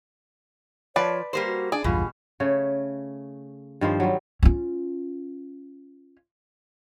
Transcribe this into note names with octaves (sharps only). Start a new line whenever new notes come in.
F3 B4 C#5 D5
G3 A#3 G4 C5
F#4
D4 G#4 D5
A#1 E2 G2 B2 G3 F4
C#3 A3 C#5
G2 D#3 F3 C5
F#3 G3
C#4 F4